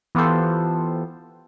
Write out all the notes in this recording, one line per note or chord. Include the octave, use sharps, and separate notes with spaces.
E3 B3 F4 G4 A4 C5